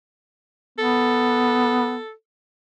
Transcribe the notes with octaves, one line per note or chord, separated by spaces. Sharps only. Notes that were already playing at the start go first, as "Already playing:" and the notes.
B3 A4